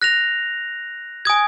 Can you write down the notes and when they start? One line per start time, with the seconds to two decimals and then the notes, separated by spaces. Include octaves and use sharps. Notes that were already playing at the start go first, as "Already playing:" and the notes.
0.02 F#6 A#6 F7
1.25 G#5 D#6 G#6